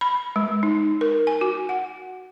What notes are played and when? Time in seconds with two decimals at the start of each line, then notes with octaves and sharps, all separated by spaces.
0.01 B5
0.36 G#3
0.63 D#4
1.01 A#4
1.27 G#5
1.41 F#4
1.69 F#5